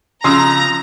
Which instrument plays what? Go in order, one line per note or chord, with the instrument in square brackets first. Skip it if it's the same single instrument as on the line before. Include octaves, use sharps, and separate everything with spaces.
[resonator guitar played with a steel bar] C#3 F3 [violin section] A#5 [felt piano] C6 D#6 E6